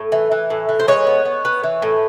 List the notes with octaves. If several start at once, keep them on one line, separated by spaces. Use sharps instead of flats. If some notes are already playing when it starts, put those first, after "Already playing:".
Already playing: A2
E3
E3
A2
E3
C5
G#3 B4 C#5
B3
B3
B3
E3
A2